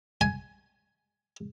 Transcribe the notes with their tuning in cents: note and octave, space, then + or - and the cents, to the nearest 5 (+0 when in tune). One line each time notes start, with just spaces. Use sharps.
G#5 +10